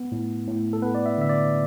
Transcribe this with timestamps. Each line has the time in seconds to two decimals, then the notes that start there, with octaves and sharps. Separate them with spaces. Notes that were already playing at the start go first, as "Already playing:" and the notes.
Already playing: B3
0.12 A2
0.47 A2
0.73 A4
0.82 B3 B4
0.95 D5
1.06 E5
1.18 D3 E5
1.29 D5